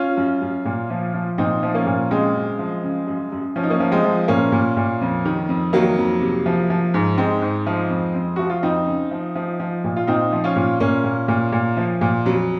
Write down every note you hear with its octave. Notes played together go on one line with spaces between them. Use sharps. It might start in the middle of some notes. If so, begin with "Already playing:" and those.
Already playing: C#4 F4
F#2
F#2
A#2
F3
F3
A#2 C4 D#4
F3
A#3 C#4
A#2
C#3 G#3 C4
F#2
F3
C#3
F#2
F#2
F3 C#4
D#4
A#3 C#4
F3
G#3 C4
F3
A#2 A#3 C#4
A#2
A#2
F2
D#3
F2
D#3 F#3 A#3
F2
C3
F3
F3
G#2
G#2 G#3 C4
G#2
F3
F2
F2
F3 F#4
F4
F2 C4 D#4
C#3
F3
F3
F3
A#2
F4
A#2 C4 D#4
F3
C#4 F4
A#2
A#2 A#3 C#4
A#2
A#2
A#2
F3
A#2
F2 F#3